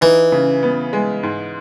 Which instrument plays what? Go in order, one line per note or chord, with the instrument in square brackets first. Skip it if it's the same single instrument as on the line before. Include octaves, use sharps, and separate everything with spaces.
[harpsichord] E3 [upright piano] D#4
[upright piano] C#3
B3
G#3
G#2